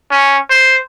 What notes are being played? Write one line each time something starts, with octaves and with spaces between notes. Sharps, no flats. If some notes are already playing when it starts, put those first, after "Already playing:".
C#4
C5